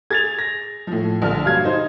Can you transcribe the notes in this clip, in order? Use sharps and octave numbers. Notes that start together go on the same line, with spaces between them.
G#4 G#6 A6 F7
A#6
A2 F3
A#1 D3 F6
G2 F#3 F5 F6 G#6
D#4 C5